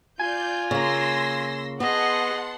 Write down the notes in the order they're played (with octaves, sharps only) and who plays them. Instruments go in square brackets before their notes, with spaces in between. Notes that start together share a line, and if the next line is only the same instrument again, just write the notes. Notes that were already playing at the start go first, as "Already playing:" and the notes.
[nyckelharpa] F4 [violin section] D5 G6 [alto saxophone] G#5
[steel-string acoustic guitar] C#3 A#3 [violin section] C6 E6 A#6
[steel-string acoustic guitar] B3 [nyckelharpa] G#4 D#5 [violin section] F#5 A5 C6